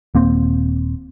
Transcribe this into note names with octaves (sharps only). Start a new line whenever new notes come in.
D#1 A#3 C4